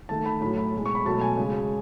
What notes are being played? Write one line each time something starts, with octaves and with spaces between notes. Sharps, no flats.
D#3 A3 A5
B5
A2 F#3 A3 B5
B5
B2 G#3
C#6
B5
B2 F#3 A3 A5
G#5
C#3 G#3